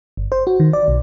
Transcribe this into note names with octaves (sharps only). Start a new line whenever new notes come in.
G1
C5
F#4
D#3
D5
B1